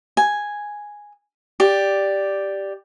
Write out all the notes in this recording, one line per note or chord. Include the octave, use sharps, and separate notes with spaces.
G#5
G4 D5